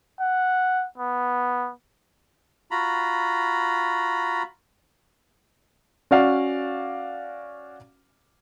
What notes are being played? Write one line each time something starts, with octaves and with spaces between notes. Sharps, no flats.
F#5
B3
F4 F#4 A#5 B5
C#4 F#4 D5 F5